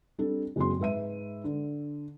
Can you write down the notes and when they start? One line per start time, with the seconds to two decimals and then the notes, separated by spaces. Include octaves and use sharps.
0.18 G3 C4 D4 A4
0.56 F#1 G#3 A#3 C4 F#4 C6
0.79 G#2 B4 E5 D#7
1.44 D3